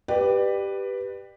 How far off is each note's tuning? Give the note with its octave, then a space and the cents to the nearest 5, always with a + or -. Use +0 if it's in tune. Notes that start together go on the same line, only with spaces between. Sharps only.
G4 +0 B4 +0 D5 +25